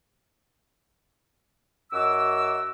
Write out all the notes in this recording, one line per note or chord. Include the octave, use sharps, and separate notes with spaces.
F#2 F#4 D#5 D6 E6